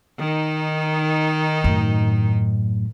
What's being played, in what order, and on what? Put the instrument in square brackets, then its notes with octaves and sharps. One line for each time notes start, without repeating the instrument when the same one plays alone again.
[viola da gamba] D#3 D#4
[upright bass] F#2 A2